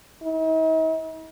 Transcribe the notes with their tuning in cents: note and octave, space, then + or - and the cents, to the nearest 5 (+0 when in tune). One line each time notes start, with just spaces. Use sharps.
D#4 +45